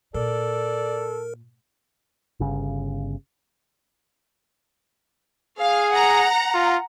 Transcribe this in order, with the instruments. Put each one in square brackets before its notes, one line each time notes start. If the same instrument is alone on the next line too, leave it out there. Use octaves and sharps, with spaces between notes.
[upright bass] A#2 [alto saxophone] A4 [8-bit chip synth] A#4 [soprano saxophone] D5
[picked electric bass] G1 C#3
[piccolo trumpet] G#4 [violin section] F5
[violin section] F#5 A#5
[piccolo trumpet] F4